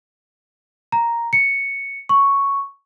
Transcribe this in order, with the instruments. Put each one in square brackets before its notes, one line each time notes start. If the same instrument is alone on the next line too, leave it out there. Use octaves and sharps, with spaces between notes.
[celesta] A#5
C#7
C#6